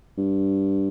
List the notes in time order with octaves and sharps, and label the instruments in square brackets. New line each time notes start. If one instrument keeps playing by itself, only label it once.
[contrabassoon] G2